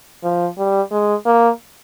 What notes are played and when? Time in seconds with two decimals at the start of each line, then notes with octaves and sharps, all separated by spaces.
0.24 F3
0.58 G3
0.91 G#3
1.26 A#3